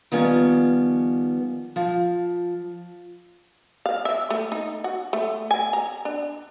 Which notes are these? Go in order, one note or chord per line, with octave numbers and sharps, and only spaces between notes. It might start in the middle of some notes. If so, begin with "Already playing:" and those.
D#3 F3 G3 B3 C#4
F3
F5
E5
A3
D#4
F#4
A3
G#5
A#5
D4